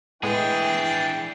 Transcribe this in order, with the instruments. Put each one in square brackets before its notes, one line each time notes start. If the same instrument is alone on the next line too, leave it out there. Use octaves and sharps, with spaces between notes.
[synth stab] A2 G#3 B3 [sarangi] E3 [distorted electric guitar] D4 G#4 [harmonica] G5